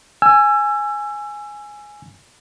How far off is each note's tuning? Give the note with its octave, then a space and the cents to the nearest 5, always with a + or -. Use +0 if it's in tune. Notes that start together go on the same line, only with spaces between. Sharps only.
G#5 +0 E6 +25